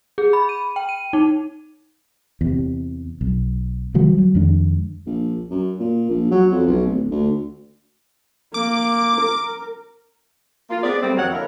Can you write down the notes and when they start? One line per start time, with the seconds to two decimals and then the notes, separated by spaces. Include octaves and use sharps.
0.18 G#4
0.33 B5
0.49 D#7
0.76 G5
0.89 D#7
1.13 D#4
2.41 E2 C3
3.21 B1
3.94 C3 D#3 F#3 G3
4.18 F#3
4.35 F2 D#3 G#3 D4
5.06 A#1
5.50 F#2
5.79 A#2
6.09 A#1
6.31 F#3
6.51 F2
6.66 B1
6.86 D1
7.11 D2
8.54 A#3 D6
9.21 A#4
10.70 A#3 F4
10.83 B3 C4 G#4 D5
11.01 G3 A3 C4
11.16 F2 D#3 F#3 C#5 F#5
11.32 D3 A#3 E4 A#4